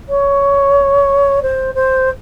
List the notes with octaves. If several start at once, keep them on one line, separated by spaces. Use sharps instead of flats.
C#5
C5
C5